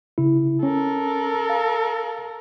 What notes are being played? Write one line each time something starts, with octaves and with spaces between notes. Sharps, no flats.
C#3 E4
C#4 A4 A#4
F5